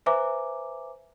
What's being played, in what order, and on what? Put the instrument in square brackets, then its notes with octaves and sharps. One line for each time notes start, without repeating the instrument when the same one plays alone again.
[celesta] B4 C5 E5 G#5 A#5 D6